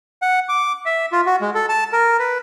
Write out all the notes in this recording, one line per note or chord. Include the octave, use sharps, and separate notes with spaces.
F#5
D6
E5
F4
F#4
G#3
A4
A5
A#4
B4